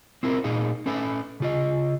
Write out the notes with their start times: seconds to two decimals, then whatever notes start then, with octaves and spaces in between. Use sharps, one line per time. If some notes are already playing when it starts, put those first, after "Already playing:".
0.23 C4 E4 F4 A#4
0.44 A#2 D#4 G#4 F5
0.86 C#4 A4 B4 G#5
1.40 C#3 F4 D#5